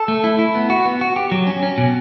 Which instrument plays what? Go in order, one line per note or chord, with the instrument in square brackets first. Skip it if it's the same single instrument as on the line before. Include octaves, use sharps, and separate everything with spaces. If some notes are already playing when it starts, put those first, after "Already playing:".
Already playing: [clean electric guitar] A4
A3
E4
E4
B3
F#4
B3
F#4
G4
F#3
C#4
C#4
B2